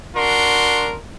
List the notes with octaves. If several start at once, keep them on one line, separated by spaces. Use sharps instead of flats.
D4 F#4 A#4 C6